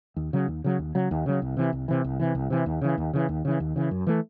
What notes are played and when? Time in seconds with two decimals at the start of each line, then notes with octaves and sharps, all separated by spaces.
0.16 D#2
0.33 C#3 F#3
0.48 D#2
0.64 C#3 F#3
0.79 D#2
0.95 C#3 F#3
1.11 D#2
1.26 C#3 F#3
1.42 C2
1.57 C3 E3
1.73 C2
1.88 C3 E3
2.04 C2
2.20 C3 E3
2.35 C2
2.50 C3 E3
2.66 D#2
2.81 C#3 E3
2.98 D#2
3.13 C#3 E3
3.29 D#2
3.45 C#3 E3
3.60 D#2
3.76 C#3 E3
3.91 F#2
4.07 E3 A3